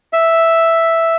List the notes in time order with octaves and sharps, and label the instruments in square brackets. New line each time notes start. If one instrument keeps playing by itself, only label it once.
[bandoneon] E5